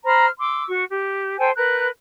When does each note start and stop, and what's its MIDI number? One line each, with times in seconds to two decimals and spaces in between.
0.05 0.27 72
0.05 0.27 82
0.05 0.27 83
0.05 0.27 89
0.39 0.66 84
0.39 0.66 86
0.39 0.66 88
0.68 0.85 66
0.68 0.85 85
0.88 1.37 67
1.38 1.51 69
1.38 1.51 72
1.38 1.51 79
1.38 1.51 80
1.55 1.88 70
1.55 1.88 71
1.55 1.88 90
1.55 1.88 91